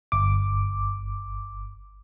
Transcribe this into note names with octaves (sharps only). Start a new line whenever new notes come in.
G1 D6